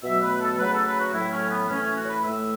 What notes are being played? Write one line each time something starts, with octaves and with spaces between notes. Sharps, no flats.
B2 F#3 A3 E5
B4
A4
C#3 F#3 A3 B4
A4
B4
F#4
A2 F#3 A3 E4
C#4
B3
A2 E3 A3 C#4
C#4
F#4
C#5
B4
A2 A3 E5